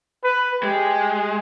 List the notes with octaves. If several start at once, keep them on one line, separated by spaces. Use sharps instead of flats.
B4
G#3 G4